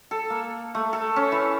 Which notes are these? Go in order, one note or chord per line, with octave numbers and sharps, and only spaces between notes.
A4
A#3
A3
A4
C#4
E3